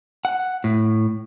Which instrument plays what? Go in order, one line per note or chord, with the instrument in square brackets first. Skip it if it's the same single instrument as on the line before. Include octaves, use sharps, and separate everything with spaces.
[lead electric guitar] F#5
A2